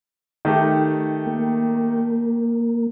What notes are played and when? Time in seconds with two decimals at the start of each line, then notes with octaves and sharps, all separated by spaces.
0.45 D#3 A3 G4
1.27 A#3